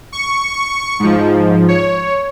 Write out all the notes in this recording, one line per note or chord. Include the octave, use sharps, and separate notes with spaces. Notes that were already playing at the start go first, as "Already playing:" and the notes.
C#6
G#2 F3
C#5